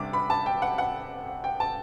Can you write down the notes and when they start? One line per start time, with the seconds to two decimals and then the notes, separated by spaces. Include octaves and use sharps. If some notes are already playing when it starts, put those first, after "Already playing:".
Already playing: C3 G3 D4 D6
0.13 B5
0.30 A5
0.46 G5
0.62 F#5
0.78 F#5
1.44 G5
1.60 A5